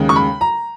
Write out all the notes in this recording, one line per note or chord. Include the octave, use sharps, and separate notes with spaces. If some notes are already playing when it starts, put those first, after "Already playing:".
Already playing: D#2 C#3 G#3
C#6
B5
A#5